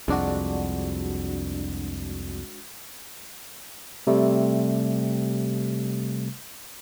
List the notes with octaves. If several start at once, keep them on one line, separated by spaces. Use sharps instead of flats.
C2 F2 G#3 D4 F#4
C3 G3 A3